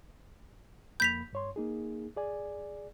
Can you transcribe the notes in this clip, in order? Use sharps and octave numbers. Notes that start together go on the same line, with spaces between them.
F2 A#3 B5 G6 B6 F7
G2 C#5 C6
A#3 D#4 G#4
G#4 D5 G#5